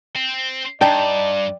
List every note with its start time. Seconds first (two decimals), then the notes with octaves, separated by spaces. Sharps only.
0.15 C4
0.81 G2 D4 D#4 D5 G5 A5